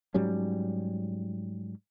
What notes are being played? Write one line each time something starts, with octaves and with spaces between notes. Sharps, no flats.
G#2 F#3 G3 C#4